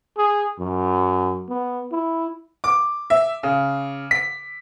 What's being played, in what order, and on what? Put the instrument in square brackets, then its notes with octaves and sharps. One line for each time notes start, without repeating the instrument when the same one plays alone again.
[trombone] G#4
F#2
B3
E4
[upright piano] D6
E5
C#3
B6